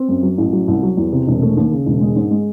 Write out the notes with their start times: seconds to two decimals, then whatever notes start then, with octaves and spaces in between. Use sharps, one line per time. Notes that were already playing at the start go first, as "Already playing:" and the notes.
Already playing: C4
0.09 F#2
0.23 F#3
0.38 A1
0.53 F#3
0.68 C2
0.83 F#3
0.97 E2
1.12 C3
1.27 E1
1.42 A3
1.57 D#2
1.72 C#3
1.86 E1
2.01 G#3
2.16 G#2
2.31 G#3